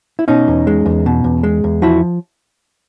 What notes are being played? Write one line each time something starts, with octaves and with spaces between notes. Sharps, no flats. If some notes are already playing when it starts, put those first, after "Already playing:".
E4
B2 C#4 D#4
E2
G#3
E2
B2
E2
G#3
E2
F3 E4 F#4